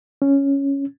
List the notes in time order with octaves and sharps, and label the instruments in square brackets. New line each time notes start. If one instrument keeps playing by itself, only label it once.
[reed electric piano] C#4